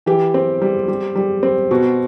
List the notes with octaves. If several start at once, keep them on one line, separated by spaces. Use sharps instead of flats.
E3 G4
C4
G3
G3
G3
C4
B2 F#4